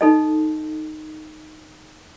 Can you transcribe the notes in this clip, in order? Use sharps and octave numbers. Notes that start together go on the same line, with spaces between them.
D#4 A4 D#5